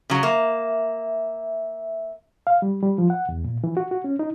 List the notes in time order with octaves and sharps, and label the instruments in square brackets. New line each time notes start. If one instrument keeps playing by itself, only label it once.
[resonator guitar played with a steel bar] C#3 F#3
[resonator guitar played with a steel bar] A#3 [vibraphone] E5
[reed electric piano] F5
G3
G3
F3
F#5
E2
A#2
E3
F#4
F#4
C#4
D#4